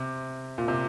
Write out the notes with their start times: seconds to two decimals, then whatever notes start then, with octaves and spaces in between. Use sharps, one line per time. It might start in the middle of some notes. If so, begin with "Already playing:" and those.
Already playing: C3
0.58 A#2
0.68 C3